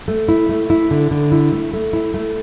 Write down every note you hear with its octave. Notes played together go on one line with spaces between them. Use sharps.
A3
E4
A3
E4
D3
D3
E4
A3
A3
E4
A3